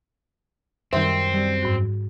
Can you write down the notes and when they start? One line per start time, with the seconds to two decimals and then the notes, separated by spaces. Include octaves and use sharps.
0.93 F#2 D#3 G3 C4 C5 E5
1.34 G3
1.62 G#2 F#4